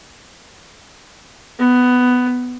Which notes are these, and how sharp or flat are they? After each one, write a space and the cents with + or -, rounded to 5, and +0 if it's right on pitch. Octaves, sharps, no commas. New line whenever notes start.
B3 +10